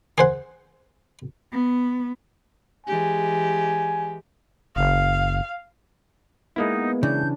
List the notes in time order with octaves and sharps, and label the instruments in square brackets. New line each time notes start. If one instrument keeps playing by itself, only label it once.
[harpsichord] G#4 C5 F#5
[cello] B3
[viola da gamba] E3 G#3 G4 [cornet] G#5
[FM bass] F#1 [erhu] F5
[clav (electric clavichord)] G#3 A#3 E4 [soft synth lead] B3 [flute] D#4
[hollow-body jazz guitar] C#3 E3 [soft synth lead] D4 [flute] G6